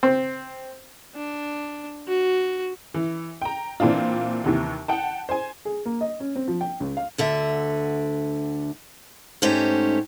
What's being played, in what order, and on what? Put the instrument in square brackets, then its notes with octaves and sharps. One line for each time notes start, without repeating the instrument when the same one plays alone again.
[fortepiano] C4
[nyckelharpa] D4
F#4
[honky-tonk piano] E3
G5 A#5
A#2 E3 C4 D4 F4
D#2 C3 E3
F#5 G5 A5
C5 G#5
[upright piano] G#4
A#3
D#5
C#4
C4
F3
G5
C#2
F5
[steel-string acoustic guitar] D2 D3 E5
G#2 A3 C#4 D#4 G4 C5